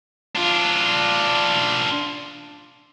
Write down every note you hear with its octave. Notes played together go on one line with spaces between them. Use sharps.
D4 F4